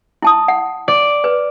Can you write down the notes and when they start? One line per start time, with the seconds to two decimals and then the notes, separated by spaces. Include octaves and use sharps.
0.22 E4 A5 D#6
0.48 F#5
0.88 D5
1.24 B4